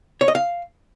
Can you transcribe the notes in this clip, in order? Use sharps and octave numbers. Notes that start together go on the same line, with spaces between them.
C#5
D#5
F5